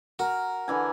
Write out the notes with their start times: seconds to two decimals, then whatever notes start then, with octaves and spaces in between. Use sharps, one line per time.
0.19 F#4 A#4
0.68 D3 E3 G#5